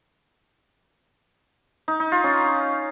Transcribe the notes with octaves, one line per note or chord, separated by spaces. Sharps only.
D#4
D#4
F4
C#4